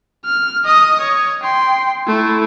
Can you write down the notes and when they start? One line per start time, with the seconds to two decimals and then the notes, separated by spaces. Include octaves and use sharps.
0.25 F6
0.65 D#5 D#6
1.01 C#5
1.43 G5 C6
2.07 A3 E4